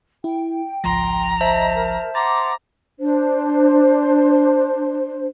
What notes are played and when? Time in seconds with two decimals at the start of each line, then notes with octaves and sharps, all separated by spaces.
0.24 E4 G5
0.84 G#1 C#2 F3 A#5 C6 A#6
1.41 C5 D#5 E5 A5
1.75 A#4
2.15 F#5 A#5 C6 D6 A6
3.00 D4 C5